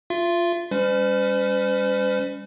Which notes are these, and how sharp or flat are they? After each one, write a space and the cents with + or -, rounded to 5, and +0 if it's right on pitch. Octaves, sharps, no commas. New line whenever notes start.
F4 +0 E5 +45
G3 +30 C#4 +25 C5 -45